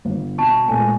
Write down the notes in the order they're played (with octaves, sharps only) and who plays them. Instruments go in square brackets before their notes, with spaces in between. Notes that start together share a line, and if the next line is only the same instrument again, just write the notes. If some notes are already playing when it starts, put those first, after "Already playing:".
[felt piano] G1
[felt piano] B2 [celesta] A5 C#6
[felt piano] A#2 G#3 A3 [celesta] G#5